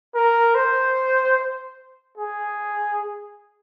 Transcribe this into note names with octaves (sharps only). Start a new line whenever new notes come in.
A#4
C5
G#4